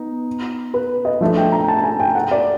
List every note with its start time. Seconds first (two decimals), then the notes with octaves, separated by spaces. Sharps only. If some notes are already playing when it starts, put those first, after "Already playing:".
Already playing: B3 D#4
0.74 B4
1.05 D#5
1.21 F3 A3 D4 E5
1.37 G5
1.52 A#5
1.68 A5
1.84 G#5
2.00 G5
2.15 F#5
2.31 D5